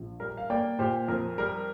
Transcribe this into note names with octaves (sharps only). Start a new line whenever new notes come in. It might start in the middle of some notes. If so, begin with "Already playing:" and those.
Already playing: A#1
G3 A#4
F5
A#3 D5 G5
A#2 G4 C5
F2 A#4
G3 A#4